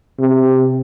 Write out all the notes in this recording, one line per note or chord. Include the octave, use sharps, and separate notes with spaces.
C3